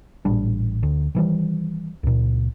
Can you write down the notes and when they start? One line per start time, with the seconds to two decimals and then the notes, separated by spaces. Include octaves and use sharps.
0.25 A1 A#2 G3 D4
0.83 D2
1.15 D#3 E3 G3
2.03 C#2 A#2